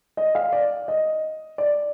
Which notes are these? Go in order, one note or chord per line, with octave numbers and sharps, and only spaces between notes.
D#5
F5
D5
D#5
D5